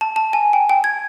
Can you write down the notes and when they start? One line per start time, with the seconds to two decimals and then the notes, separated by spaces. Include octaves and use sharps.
0.01 A5
0.16 A5
0.33 G#5
0.53 G5
0.69 G5
0.84 G#6